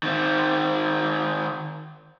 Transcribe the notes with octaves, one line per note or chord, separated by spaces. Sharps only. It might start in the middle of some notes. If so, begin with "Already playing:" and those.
D#3 C4